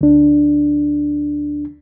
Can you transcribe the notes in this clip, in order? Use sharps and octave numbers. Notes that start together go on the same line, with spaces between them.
D2 D4